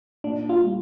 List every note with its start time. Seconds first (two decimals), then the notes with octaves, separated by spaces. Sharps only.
0.24 A#2 D4
0.49 F4
0.62 G3